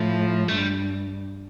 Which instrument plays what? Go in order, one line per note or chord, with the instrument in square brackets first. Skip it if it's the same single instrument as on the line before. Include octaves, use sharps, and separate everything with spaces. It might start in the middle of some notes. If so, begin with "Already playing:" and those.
Already playing: [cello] A2 [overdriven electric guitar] F3
[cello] G2 [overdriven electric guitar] A3
[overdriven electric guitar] G3